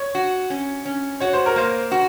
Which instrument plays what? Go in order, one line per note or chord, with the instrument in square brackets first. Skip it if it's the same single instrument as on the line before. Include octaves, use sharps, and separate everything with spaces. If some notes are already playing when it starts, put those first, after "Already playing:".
Already playing: [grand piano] C#5
[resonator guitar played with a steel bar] F#4
C#4
C#4
[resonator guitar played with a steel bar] F#4 [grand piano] C#5
[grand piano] C5
A#4
[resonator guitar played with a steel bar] A#3 [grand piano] C5
[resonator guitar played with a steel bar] F#4